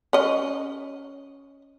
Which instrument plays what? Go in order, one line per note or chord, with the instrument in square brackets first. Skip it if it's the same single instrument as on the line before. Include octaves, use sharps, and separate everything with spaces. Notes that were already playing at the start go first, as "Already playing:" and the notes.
[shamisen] C#4 D#5